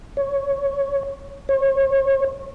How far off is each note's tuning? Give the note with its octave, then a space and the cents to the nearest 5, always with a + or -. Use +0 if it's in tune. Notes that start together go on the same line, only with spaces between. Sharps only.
C#5 +5
C#5 -35